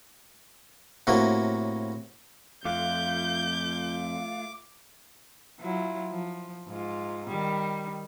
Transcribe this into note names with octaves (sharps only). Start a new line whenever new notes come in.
A2 C3 F#3 A#3 F#4
F2 A3 F4 D6 G6
F#3 E4 F4
F3
G#2 F4
D#3 G3